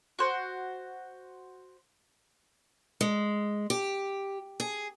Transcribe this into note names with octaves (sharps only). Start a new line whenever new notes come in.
F#4 C5
G#3
G4
G#4